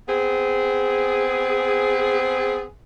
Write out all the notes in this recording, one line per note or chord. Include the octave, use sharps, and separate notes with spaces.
B3 C4 G#4